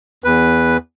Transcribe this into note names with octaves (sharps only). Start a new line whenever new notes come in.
E2 B4